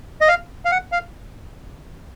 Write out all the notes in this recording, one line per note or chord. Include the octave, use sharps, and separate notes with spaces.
D#5
F5
F5
F#5
F5